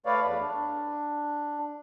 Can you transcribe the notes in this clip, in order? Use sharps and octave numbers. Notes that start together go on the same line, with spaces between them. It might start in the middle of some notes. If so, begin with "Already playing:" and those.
A3 B4 C#5 D5 F5
E2
D4